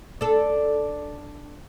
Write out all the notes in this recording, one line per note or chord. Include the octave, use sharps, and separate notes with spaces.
D4 A4